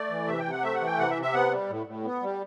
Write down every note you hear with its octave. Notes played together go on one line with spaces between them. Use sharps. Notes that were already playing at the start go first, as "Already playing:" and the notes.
Already playing: A3 D5
E3
C3 E5
G5
C3
F#5
A3 E5
F#5
E3
G5
C3 F#5
E5
C3
E5
B3 F#5
G3
A2
A2
B3
G3